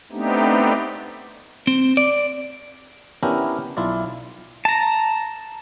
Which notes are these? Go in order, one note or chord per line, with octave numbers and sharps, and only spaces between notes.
A3 B3 C4 D4 D#4 G4
C4
D5
B3 C#4 D4 E4 G4 A#4
B1 E4 F4 D5
A5 A#5